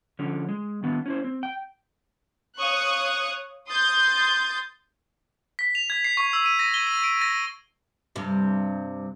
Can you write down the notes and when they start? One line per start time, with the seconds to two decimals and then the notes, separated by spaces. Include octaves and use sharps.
0.19 D3 F3 C#4
0.49 G#3
0.83 D#3 B3 D4
1.06 C#4 E4 C5
1.24 C4
1.43 G5
2.59 C#5 F5 C#6 D#6 F#6
3.69 C6 D#6 G6 A6
5.59 B6
5.75 F7
5.90 G#6
6.04 C7
6.17 C#6
6.33 E6
6.46 D#7
6.59 A#6
6.74 G7
6.87 D#7
7.04 D7
7.21 A#6
8.16 G2 C3